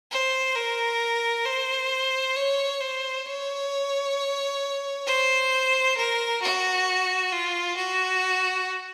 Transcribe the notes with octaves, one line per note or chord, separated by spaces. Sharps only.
C5
A#4
C5
C#5
C5
C#5
C5
A#4
F#4
F4
F#4